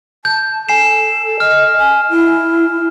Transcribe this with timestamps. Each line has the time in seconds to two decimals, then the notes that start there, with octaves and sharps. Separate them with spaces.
0.25 A5 G6
0.69 A4 G#5 C7 E7
1.40 D#5 F6
1.78 G#5
2.10 E4